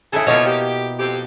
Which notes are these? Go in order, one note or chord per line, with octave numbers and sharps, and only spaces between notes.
C#3 E4 G#4 A4
B2 F3 A#3 C#5
G4
F2 C4 G4